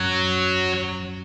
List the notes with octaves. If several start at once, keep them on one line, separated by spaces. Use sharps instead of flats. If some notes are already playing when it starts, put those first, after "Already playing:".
Already playing: F#2 F#3